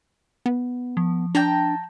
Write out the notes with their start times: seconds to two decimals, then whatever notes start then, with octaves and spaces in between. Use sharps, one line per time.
0.46 B3
0.97 F3
1.35 D4 G5 A5 A#5